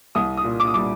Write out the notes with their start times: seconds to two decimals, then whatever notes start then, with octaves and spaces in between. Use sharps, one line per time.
0.15 C2 D#6
0.37 D#6
0.44 A#2
0.60 D6
0.67 D#6
0.74 G3 D6